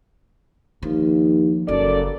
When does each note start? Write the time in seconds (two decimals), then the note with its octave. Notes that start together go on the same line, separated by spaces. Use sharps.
0.82 D#2 F3
1.68 F#1 F#2 A4 D5